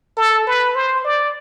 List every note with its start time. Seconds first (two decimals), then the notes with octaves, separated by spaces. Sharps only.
0.17 A4
0.47 B4
0.75 C5
1.04 D5